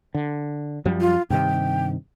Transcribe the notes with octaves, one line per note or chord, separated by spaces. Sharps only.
D3
F#2 F3 G3
F4
G2 C3 D#3 G5